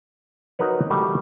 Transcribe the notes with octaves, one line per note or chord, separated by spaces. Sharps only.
D#4 F#4 A#4 B4 C#5
G3 A3 F#4 G5